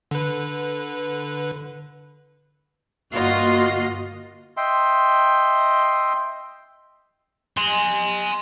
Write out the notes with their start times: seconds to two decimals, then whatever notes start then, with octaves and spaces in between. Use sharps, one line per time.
0.11 D3 B4
3.13 G1 A#3 F4 F#4 D#5 C7
4.57 D#5 E5 G5 C6
7.57 G#5 C6